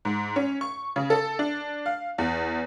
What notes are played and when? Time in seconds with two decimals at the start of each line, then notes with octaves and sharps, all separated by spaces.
0.05 G#2
0.36 C#4
0.61 C#6
0.96 C#3
1.10 A4
1.39 D4
1.86 F5
2.18 E2